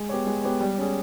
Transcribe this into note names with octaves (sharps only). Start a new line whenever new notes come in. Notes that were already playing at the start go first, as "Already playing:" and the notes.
Already playing: G#3
B3 G4 C#5
G#3
B3 G4 C#5
G3
C#4 G#4